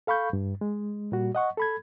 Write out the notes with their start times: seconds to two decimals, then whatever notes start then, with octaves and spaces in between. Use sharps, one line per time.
0.07 A4 F5 B5 C#6 G6
0.33 G2
0.61 G#3
1.12 A#2 G3 F#4
1.35 D#5 F#5 C#6
1.57 A4 B5 G#6